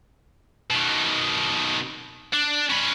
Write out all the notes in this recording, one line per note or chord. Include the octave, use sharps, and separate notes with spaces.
B2 D#3
D4
C#4 B4